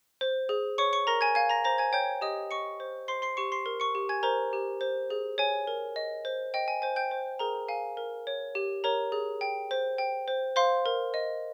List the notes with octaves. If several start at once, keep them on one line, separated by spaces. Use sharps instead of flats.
C5
G#4
C#5 C#6 C#7
C#6 C#7
A#4 A#5 A#6
G#5 G#6
F5 G#5 G#6
A#5 A#6
C5 A#5 A#6
G#5 G#6
C#5 G5 G6
G4 D#5 D#6
D#5 C#6 C#7
C5
C5 C6 C7
C6 C7
G4 C#6 C#7
C6 C7
A#4
C#6 C#7
G4
G#5 G#6
A#4 C5 A#5
G4
C5
G#4
C#5 G#5
A#4
D#5
C5
D#5 G5
G#5
C5 G#5
G5 G6
C5
G#4 A#4 A#5
F5 G#5
A#4
C#5
G4
A#4 C#5 A#5
G#4
G5
C5
G5
C5
C5 F5 C6
A#4
D#5